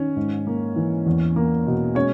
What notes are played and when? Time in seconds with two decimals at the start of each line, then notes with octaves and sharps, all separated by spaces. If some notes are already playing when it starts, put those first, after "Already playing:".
Already playing: D#3 C#4 C#5
0.16 G#2
0.47 A#3
0.76 E3
1.06 E2
1.36 A#3
1.66 B2
1.95 G#3 C#4 C#5